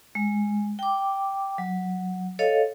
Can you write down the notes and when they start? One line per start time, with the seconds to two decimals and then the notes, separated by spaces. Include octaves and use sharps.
0.15 G#3
0.79 G5 D6
1.58 F#3
2.39 A4 C#5 D#5 F5